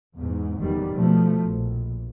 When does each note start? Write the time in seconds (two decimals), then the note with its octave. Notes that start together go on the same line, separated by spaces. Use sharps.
0.16 E2 G#2
0.60 F1 E2 D#3 G3
0.94 B2 F3 A3
1.43 A#1